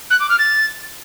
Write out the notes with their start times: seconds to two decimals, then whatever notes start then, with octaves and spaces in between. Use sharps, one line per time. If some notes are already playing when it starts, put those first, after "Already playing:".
0.10 F#6
0.20 D6
0.29 F6
0.39 A6